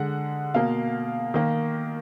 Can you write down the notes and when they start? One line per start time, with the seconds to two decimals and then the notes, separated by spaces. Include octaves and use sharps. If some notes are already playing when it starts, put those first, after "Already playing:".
Already playing: D3 G#3 F#5
0.54 B2 A#3 F5
1.34 D#3 A#3